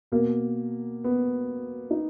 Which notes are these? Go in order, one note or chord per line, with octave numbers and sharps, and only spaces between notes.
B2 A#3
B3
D#4